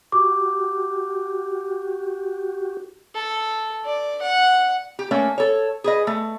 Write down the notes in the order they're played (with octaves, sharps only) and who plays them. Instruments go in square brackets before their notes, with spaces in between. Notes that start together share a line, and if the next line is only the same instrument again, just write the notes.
[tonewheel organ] F#4 G4 [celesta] D6
[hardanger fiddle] A4
D5
F#5
[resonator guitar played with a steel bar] G4
A3 A#3 C#4
A4 C#5
G#4 B4 D#5
A3